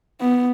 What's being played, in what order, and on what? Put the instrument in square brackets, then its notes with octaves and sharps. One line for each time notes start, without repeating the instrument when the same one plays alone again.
[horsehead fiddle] B3